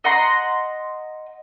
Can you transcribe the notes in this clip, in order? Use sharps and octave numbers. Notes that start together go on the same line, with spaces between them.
D#5 F#5 A#5 C6